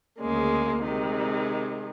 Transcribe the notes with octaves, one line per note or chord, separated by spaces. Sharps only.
D2 C#3 G#3 A#3
C3 D#3 G#3